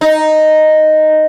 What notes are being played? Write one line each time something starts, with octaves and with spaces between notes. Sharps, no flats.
D#4